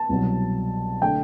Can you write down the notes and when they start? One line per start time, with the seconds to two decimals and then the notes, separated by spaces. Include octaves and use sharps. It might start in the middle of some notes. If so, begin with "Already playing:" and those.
Already playing: A5
0.09 C2 B2 F#3
1.01 D3 A3 D4 G5